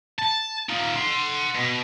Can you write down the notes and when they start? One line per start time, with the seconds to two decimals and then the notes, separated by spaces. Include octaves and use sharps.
0.19 A5
0.69 D#4 F4
0.96 F#5 C6
1.55 B2